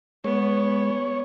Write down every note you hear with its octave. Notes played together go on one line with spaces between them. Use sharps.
G#3 B3 C#5